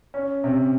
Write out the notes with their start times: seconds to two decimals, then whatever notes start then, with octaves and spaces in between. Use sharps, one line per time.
0.14 C#4
0.44 C3